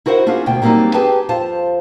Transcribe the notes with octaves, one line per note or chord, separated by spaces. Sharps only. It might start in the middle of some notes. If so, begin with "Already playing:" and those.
E4 F#4 A#4 C5 F#5
C#4 D4 F4 F#4 G#4
D2 B2 G5
F#3 G3 A#3 C4 D#4 D5
G4 G#4 B4 G5 A5
F2 F4 C5 A5